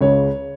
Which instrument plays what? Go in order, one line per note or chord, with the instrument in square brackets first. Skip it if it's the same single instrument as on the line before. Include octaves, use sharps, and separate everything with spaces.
[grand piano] C#2 C#3 G#3 C#5